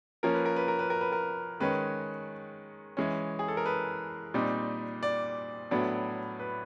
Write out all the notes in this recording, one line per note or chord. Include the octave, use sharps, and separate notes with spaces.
F3 A#3 C#4 A#4
B4
A#4
B4
A#4
B4
A#4
B4
A#4
D#3 G#3 C#4 B4
E3 G#3 C#4
G#4
A4
A#4
B4
A#2 G3 C4 D#4
D5
A2 F#3 B3 D4
B4